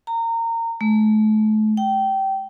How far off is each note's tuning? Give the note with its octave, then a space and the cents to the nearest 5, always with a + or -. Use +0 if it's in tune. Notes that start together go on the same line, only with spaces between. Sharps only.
A#5 -25
A3 -35
G5 -20